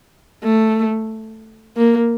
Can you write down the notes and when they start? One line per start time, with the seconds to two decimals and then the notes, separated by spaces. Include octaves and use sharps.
0.44 A3
1.76 A#3